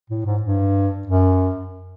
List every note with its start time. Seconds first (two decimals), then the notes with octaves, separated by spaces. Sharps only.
0.10 A2
0.25 G#2
0.43 G2
1.07 F#2